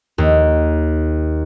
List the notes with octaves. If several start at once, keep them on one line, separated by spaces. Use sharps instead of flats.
D#2